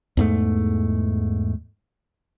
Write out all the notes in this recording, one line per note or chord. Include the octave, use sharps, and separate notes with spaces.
E2 G#2 A3